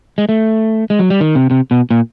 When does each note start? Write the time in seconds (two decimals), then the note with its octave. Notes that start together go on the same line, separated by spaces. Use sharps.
0.18 G#3
0.29 A3
0.90 G#3
0.99 F#3
1.10 G3
1.21 D#3
1.35 C3
1.51 C3
1.71 B2
1.91 A#2